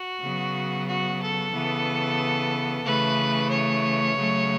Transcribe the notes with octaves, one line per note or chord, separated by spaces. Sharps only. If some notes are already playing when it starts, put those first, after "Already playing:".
Already playing: F#4
C#3 F#3 B3
F#4
A4
C#3 E3 B3
C#3 E3 A3 B4
C#5
C#3 F#3 A3